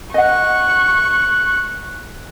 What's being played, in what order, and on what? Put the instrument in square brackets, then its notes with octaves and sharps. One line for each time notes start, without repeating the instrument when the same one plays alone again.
[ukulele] D#5 F#5 [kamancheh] C#6 [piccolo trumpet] F#6